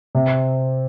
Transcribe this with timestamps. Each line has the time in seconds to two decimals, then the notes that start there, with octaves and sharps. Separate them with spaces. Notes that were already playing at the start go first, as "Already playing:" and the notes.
0.15 C3